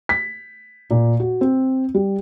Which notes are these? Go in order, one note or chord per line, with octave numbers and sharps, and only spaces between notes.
B6
A#2
F#4
C4
G3